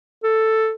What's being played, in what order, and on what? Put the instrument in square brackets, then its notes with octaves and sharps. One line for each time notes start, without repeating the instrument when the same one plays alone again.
[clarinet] A4